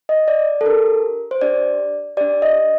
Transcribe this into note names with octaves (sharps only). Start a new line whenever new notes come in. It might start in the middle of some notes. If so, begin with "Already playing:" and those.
D#5
D5
A4
D4 G4 A#4
C5
D4 G4 D5
D4 G4 D5
D#5